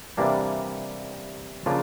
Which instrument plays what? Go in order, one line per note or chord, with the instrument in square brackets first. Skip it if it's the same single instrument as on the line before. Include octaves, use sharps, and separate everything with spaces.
[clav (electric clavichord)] C3 E3 G3 A#3 D4
C#3 F3 A#3 D4 F4